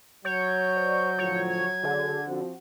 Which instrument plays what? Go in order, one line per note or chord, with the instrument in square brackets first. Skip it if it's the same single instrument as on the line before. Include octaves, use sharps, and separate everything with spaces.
[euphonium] F#3 [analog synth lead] C#5 [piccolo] G6
[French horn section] C5 D5
[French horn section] A2 D3 F3 [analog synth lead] C#5
[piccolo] G#6
[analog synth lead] D3 [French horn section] F#4 G#4
[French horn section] F3 C4 F#4